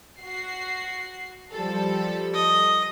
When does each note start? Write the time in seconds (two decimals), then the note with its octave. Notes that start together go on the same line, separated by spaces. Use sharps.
0.21 F#4 C7
1.53 F3 G3 A4
2.34 D#5